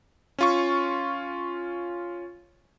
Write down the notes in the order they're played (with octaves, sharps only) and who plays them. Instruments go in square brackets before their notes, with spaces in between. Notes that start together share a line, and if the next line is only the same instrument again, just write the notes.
[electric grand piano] C#4 F4 C#6